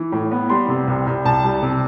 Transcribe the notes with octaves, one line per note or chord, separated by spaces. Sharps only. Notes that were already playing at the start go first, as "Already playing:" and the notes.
Already playing: E3
A2
B3
G3 C6
C3
C2
C2
C2 A5
G3
C3